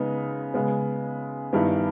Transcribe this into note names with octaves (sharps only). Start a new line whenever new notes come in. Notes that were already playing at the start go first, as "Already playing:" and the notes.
Already playing: C#3 G#3 B3 D#4
C#3 G#3 B3
G2 D#3 G3 B3 E4